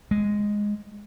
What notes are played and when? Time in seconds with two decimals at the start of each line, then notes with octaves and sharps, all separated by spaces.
0.11 G#3